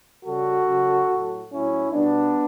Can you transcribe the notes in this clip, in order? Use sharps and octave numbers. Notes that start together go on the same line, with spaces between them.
C#3 G3 F#4 A4
C#3 F#3
A2 F#3
A2 F#3 C#4 E4
B2 G3 B3 D4